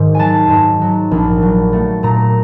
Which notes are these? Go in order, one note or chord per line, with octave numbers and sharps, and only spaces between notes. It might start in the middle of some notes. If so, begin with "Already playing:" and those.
Already playing: G#2 D#3
F#3 G#5 A5
G#2
F#3
A#1
F#3
A3
A#2 A#5